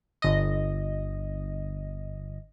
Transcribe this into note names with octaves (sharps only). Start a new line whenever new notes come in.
G1 D#5